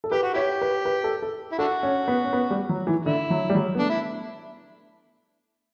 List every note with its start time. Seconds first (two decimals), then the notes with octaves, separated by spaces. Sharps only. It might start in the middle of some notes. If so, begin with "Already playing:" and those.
0.04 A4
0.12 G4 B4
0.23 F#4
0.34 E4 G4 C#5
0.61 B4
0.85 B4
1.04 A4
1.22 A4
1.52 E4
1.59 D4 F#4 A4
1.83 C#4
2.08 B3
2.24 C#4
2.33 B3
2.51 G3
2.69 F#3
2.87 E3
3.06 D3 E4
3.30 F#3
3.50 G3
3.55 F#3
3.75 B3
3.79 A3 D4
3.90 E4